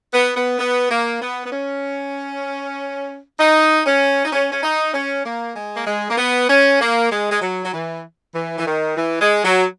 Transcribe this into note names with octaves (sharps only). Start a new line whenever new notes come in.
B3
B3
B3
A#3
B3
B3
C#4
D#4
C#4
D#4
C#4
C#4
D#4
C#4
A#3
G#3
A#3
G#3
A#3
B3
C#4
A#3
G#3
G#3
F#3
F#3
E3
E3
E3
D#3
E3
G#3
F#3